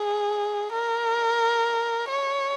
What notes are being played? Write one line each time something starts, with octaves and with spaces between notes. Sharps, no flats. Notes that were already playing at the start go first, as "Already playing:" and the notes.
Already playing: G#4
A#4
C#5